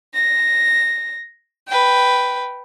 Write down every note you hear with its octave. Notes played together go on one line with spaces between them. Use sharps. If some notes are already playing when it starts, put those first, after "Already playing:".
A#6
B4 G5